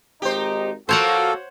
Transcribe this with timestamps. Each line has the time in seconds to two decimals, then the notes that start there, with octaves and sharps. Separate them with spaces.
0.22 G#1 D#4 G4 C5
0.89 F3 A#3 F#4 A4 C5 C#5 F#5